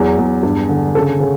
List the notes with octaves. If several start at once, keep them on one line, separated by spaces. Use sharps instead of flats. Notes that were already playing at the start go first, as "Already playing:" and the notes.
Already playing: E2 F#3
E2
G2
D3
C#3 A4
C#3